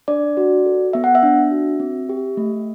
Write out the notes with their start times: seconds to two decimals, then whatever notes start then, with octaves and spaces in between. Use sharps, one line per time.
0.08 D4 D5
0.37 F#4
0.66 A4
0.93 B3 E5
1.04 F#5
1.15 E5
1.23 D4
1.51 F#4
1.80 C4
2.09 G4
2.37 A3